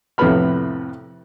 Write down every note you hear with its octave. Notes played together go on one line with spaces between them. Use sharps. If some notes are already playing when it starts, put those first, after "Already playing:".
F2 A2 C3 B3 B5 F6